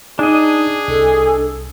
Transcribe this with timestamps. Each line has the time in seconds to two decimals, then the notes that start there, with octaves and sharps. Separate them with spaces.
0.19 D4 D#4 G#4 D#5
0.88 C2 A4